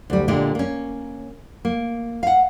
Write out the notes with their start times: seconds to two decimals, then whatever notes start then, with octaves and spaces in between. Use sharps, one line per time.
0.10 D2 G3
0.28 A#2 D3 G#3 G4
0.55 A#3 C#4
1.65 A#3
2.23 F5 F#5